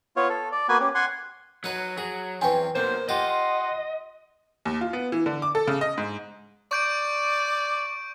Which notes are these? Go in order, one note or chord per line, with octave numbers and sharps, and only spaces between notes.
B3 F4 C#5
A4
D5
A#3 B3 F#4 B4 G#5
C#4 G4
F#5 G#5 C6
F#3 D#4 B4
F#3 G#4
E2 C4 B4 C#5 G5 G#5
B1 B2 A#3 C5
F4 G4 D#5 F5 F#5 C6
D#2
F4
B3
E3
D3
D6
A4
C#3
D#5
G#2
D5 C#6 G6 D7